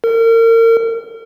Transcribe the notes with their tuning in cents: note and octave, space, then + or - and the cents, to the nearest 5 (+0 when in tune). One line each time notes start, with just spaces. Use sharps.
A#4 -35